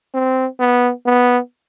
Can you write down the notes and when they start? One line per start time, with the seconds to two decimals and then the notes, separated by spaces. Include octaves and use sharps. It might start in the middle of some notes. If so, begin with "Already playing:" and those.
0.14 C4
0.60 B3
1.06 B3